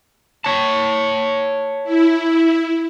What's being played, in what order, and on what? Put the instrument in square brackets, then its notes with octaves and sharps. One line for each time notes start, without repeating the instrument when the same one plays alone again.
[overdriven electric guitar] C#5 A5
[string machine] E4